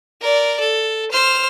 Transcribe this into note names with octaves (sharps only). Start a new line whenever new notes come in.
A#4 D5
A4
C5 F6